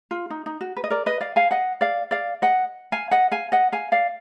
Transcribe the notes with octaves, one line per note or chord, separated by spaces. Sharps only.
F4
D#4
D#4
F#4
B4
D#5
A#4 D5
B4 D#5
D5 F5
F5 G#5
D#5 F#5
D5 F5
D5 F5
D#5 F#5
F5 G#5
D#5 F#5
F5 G#5
D#5 F#5
F5 G#5
D5 F5